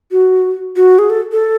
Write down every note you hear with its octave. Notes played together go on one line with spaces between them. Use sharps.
F#4
F#4
G#4
A4
A4